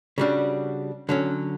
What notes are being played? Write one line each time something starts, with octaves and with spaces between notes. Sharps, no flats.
C#3 G3 D4 F#4
D3 F#3 C#4